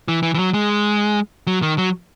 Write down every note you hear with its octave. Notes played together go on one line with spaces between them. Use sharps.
E3
E3
E3
F#3
G#3
F#3
D#3
F#3